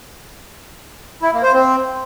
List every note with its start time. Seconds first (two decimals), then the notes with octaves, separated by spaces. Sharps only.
1.22 E4
1.32 A#3
1.43 C5
1.53 C4